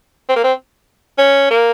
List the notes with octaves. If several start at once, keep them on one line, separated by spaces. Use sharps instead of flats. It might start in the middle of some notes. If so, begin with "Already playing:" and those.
C4
A#3
C4
C#4
A#3